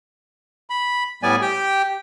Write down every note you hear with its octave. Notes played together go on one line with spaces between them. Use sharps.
B5
A2 G3 B3 D5 G#5
G4 G5